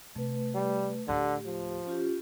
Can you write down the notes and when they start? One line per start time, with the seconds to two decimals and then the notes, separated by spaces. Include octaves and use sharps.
0.15 C3 A3 B4
0.55 G3
1.08 D2 A2 D3 G4
1.45 F3
1.87 C#4 F4 G4